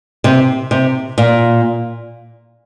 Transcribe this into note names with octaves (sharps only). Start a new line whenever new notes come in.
C3
C3
A#2